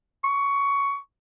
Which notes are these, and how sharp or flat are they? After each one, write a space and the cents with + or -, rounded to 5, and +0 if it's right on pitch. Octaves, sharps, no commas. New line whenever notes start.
C#6 +15